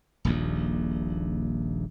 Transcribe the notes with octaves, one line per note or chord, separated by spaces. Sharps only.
D#1 A#1 D#2